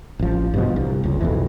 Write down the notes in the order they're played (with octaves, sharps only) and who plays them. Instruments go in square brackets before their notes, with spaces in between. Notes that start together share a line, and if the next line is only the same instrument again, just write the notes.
[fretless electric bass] A1 F3
G2 B2 F3
C2
F#1 C#2
B1 F2 E3